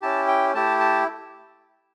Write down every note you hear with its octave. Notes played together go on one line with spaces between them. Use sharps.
C#4 E4 G4 A5
G5
A3 E4 G4 A5
A5